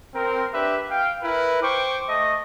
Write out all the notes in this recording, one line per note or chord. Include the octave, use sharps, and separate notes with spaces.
C4 A#4
D4 G4 B4 E5
F5 G5
E4 A#4 B4
C5 G5 C#6 D6
A3 D#5